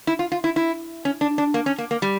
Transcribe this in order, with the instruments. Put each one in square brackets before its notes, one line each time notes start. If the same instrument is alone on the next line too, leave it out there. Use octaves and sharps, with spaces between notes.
[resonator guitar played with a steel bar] E4
F4
F4
E4
E4
C#4
D4
D4
A#3
C#4
A#3
A#3
G3